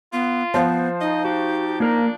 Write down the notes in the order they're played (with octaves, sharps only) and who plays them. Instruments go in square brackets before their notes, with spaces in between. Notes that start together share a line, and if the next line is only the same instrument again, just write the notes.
[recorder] B3 [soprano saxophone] F4
[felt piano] F3 C5 [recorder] B3
[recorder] D#4 [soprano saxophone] D#5
[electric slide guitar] F#4 [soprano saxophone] G4
[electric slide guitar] A#3 A#4 A#5 [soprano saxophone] D4